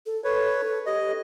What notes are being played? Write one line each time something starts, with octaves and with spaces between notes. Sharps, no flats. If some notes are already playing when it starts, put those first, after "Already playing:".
A4
A4 B4 C#5
G4 D#5